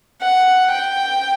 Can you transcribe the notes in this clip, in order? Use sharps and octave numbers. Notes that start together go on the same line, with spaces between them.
F#5
G5